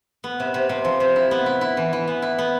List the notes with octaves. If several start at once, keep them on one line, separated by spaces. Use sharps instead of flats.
B3
C3
C3
C3
F3
C3
E4
B3
E4
E4
E3
E3
B3
E4
B3